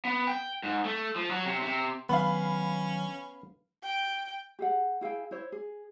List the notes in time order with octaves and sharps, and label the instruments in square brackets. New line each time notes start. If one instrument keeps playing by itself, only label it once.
[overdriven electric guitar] B3
G5
G#2
A3
F3
F#3
C3
C3
[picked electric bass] D#3 F#3 D4 [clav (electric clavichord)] B3 [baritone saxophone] C#4 [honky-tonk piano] F5 B5
[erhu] G5
[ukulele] G4 G#4 F#5
E4 G#4 F5 G5
E4 C5 C#5
G#4